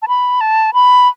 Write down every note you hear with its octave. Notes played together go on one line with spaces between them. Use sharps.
A5
B5
A5
B5